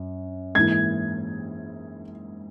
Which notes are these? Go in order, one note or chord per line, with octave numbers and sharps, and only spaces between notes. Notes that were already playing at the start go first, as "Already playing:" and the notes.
Already playing: F#2
G#2 E3 A#3 E4 G#6